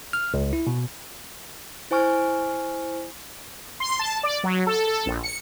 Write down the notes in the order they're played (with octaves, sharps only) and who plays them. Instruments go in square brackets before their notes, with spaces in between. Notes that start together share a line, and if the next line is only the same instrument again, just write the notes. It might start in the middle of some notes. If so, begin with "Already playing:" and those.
[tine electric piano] F6
C#2
E4
B2
[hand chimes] E4 C5 G#5 C#6 F6
[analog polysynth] C6
A5
D5
F#3
A4
A4
A#1
C#7